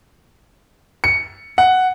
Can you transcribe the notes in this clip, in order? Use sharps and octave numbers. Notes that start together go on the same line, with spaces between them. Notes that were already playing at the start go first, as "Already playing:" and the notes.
C#7
F#5